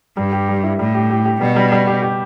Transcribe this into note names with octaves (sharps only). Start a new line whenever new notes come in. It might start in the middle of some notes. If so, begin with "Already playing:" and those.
G2 G3
G4
G3
E4
A2 G3
G4
G4
G4
B2 G3
G3
G3
G4
G4